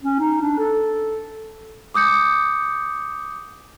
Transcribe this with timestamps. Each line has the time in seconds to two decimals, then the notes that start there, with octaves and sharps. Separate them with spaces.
0.03 C#4
0.20 D#4
0.42 D4
0.58 A4
1.94 D6 D#6 G6 C#7